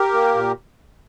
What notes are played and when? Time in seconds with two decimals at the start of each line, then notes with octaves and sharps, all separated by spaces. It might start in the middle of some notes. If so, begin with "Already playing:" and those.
Already playing: G4 A#4
0.14 A#3
0.35 A#2